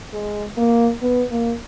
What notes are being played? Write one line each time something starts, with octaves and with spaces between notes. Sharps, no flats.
G#3
A#3
B3
A#3